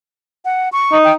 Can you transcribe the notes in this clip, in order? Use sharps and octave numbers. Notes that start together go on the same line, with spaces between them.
F#5
C#6
D#4
G5